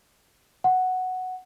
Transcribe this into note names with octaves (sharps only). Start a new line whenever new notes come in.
F#5